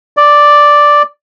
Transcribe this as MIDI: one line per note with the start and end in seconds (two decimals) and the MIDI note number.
0.17 1.03 74